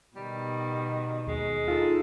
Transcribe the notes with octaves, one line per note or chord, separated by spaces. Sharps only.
B2 D#3 G3
D#2 G#3
D#4 F4 A4